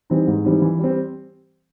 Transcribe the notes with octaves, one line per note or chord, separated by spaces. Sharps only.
E3 G3 C4 D#4
G#2
E3 G3 C4 D#4
E3
G3 C4